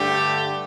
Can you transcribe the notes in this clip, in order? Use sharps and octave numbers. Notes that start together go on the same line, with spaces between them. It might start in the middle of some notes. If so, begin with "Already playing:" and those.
Already playing: G2 D3 A3 G4